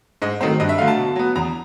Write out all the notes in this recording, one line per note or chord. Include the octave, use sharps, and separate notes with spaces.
G#2 D#5
D#3 F#3 A3 C4
G2 D#5
E5
D3 F#3 A3 F5
A5
B2
F#3 B3
E2 A#5